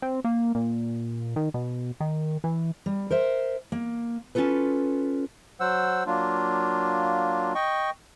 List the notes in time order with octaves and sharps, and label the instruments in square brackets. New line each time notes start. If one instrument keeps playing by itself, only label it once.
[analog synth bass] C4
A#3
A#2
D#3
B2
D#3
E3
[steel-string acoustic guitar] G3
A#4 C5 E5
A#3
C#4 D#4 F4 A4 B4
[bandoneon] F#3 C5 F#5 E6
F#3 A#3 D4 F4
D#5 G5 C#6